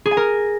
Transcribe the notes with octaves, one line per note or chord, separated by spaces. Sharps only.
G#4
G#5
A#4